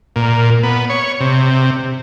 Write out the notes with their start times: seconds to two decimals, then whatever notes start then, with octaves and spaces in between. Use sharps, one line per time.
0.16 A#2
0.63 B3
0.90 C#5
1.20 C3